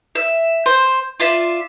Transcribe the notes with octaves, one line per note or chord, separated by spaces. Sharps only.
E5
C5
F4 D5 E5